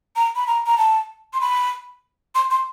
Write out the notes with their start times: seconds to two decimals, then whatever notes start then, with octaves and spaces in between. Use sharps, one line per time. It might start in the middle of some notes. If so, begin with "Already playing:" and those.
0.16 A#5
0.36 B5
0.47 A#5
0.66 A#5
0.78 A5
1.34 C6
1.41 B5
2.35 C6
2.50 C6